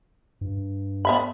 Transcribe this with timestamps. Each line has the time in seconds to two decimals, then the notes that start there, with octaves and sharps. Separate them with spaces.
0.41 G2
1.05 B3 E5 B5